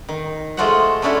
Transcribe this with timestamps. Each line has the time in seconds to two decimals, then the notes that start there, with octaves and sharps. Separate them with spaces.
0.09 D#3
0.57 G#3 A3 F4 F#4 C5 F#5
1.02 A3 C#4 D4 E4 F#4